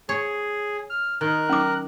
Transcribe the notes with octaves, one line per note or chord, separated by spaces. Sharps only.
G#4 C#5
F6
D#3 A#4 F#6
C#4 D6